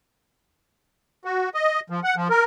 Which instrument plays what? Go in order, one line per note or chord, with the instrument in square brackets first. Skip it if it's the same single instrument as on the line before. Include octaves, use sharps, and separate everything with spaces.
[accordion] F#4
D#5
F3
F#5
F3
A#4